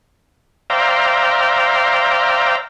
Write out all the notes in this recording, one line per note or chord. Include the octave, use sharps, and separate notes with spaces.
C5 D5 E5 F5 G5 A#5